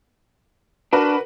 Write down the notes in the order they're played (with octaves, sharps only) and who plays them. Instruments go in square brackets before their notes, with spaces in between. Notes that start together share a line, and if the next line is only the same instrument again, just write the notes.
[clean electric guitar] D4 [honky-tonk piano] F#4 A#4 B4